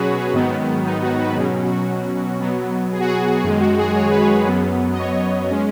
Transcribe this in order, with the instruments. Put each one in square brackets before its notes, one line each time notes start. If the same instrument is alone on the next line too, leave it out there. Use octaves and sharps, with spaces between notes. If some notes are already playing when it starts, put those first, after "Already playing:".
Already playing: [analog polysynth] B2 F#3 C#4 F#4 G#4 B4 C#5
G#2 D#3 F#3 B3
D#4
F#4
B4
B2 F#3 C#4 G#4
F#4
B2 F#3 B3
G#4
F#4
G#4
F#2 D#3 G#3 G#4
F#4
G#4
C#5
B4
C#5
F#2 F#3 B3
D#5
C#5
G#3 C#4